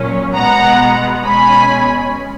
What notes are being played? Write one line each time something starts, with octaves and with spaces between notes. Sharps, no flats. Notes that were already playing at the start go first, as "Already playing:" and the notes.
Already playing: A#2 F#3 C#4
B2 G#3 B3 F#5 A#5
B2 G#3 C#4 G#5 B5